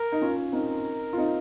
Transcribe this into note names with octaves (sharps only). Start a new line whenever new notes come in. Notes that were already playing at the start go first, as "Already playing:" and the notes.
Already playing: A#4
D#4
C#4 F4
C4 D#4 A#4
F4
C4 D#4